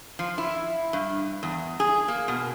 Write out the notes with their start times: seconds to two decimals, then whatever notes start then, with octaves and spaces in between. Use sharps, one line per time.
0.19 F3
0.38 E4
0.93 G2
1.43 E2
1.80 G#4
2.08 A#3
2.28 B2